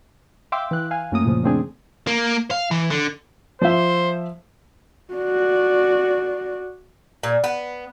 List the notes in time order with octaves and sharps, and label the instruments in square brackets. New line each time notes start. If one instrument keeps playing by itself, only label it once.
[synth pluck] E5 F5 G5 C6 D6 E6
E3 F#6
F5 G#5
F#2 A3 A#3 D#6
A#2 C#3 F3
C#3 F3 A3 C4 D4 G#4
[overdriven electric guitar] A#3
F5
E3
D3
[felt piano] F3 E5 [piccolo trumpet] C5
[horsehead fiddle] F#4 D5
[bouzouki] A#2
B3